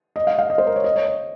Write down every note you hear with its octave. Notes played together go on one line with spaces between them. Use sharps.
D#5
F5
F5
D#5
C5
A#4
C#5
D#5
C#5
C#5